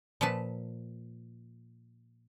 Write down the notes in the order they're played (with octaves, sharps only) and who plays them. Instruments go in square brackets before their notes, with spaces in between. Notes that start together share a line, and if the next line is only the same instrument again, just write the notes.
[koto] A#2 F3 B4 A5